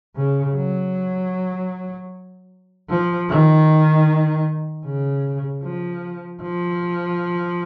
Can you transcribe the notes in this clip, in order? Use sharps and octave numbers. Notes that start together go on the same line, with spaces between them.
C#3
F#3
F3
D#3
C#3
F3
F3